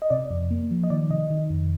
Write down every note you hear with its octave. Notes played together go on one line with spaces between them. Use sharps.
D#5
C3 D5
F2
A#3
F3
D#5
D#3 D5
C3 D#5
D#3
F2